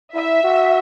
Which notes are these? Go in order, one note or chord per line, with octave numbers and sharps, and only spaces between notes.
E4 E5
F#4